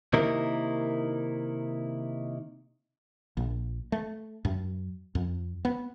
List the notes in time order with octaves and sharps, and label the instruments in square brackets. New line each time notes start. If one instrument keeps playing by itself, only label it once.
[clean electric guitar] C3 D#3 A#3 D#4 E4 A#4
[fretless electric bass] A#1
A3
F#2
F2
B3